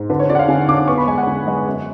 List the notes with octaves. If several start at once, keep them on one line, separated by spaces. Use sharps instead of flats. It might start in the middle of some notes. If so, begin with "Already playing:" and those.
Already playing: G#2
D3 B4
C#5
D3 D5
F#5
F5
D3 G#5
D3 D6
B3 C#6
B5
G#3 G#5
F#5
D3
G#3
F#2